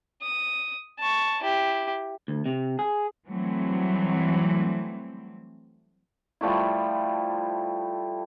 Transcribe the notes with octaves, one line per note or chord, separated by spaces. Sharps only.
D#6
A5 C#6
E4 G4
D2
C3
G#4
E3 F#3 G3 A3 C4
F3 G3 A3 E4